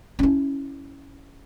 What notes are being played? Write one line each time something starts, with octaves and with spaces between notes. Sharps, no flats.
C#4 E4